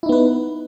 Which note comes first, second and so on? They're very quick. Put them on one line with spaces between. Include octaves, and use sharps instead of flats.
E4 D#4 B3 B4